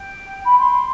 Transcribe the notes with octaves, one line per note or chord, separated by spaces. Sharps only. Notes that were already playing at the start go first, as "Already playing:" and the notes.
Already playing: G5
B5
C6
C6